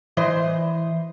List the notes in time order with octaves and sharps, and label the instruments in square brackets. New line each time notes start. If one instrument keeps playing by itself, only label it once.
[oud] E3 C5 D#5